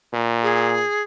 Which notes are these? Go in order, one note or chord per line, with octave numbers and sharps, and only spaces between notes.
A#2
G#4